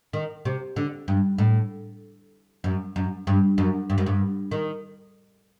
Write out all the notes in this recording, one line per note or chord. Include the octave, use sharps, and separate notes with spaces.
D#3
C3
D3
G2
A2
F#2
F#2
G2
F#2
G2
F#2
G2
D#3